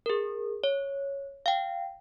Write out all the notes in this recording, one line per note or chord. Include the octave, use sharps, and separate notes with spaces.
G#4 A#4
C#5
F5 G5